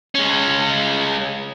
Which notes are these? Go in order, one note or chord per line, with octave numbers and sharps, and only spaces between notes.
G#3 C#4